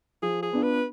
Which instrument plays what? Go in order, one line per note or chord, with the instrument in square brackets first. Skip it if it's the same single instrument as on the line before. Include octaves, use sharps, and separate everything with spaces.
[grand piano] F3 [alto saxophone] G#4
[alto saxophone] G#4
[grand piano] B3 D4 F4
[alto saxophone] B4